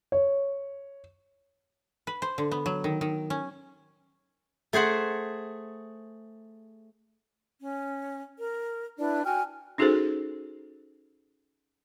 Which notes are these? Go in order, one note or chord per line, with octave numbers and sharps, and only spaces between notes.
C#5
B4
C5
D3
B3
F#3
D#3
D#3
C#4
A3 G#4 C5 F#5
C#4
A#4
D4 E4 B4 D5
F#4 G5 G#5 F6
C#4 D#4 F#4 G#4 A4 C5